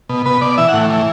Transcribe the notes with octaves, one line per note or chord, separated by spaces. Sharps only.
B2
B2 B4
B2 D5
E3 E5
F#5
A2
E3